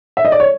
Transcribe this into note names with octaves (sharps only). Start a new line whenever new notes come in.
E5
D#5
D5
C#5